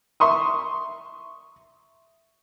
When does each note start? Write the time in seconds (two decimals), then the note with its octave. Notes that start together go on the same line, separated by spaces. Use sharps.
0.20 E5 C6 C#6 D#6